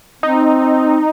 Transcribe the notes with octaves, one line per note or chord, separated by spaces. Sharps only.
C4 D#4